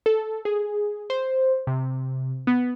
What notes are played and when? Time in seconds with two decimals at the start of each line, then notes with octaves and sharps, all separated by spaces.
0.06 A4
0.45 G#4
1.10 C5
1.67 C3
2.47 B3